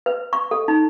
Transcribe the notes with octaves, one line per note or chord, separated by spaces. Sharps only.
B4
C#6
A4
D#4